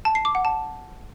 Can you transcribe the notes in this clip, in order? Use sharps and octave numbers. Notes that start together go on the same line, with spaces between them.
A5
C7
D6
F#5
A5